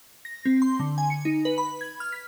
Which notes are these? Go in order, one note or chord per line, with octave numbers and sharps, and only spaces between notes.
A#6
C4
C6
D3
G#5
C#7
D#4
B4
B5
G#6
F6
B6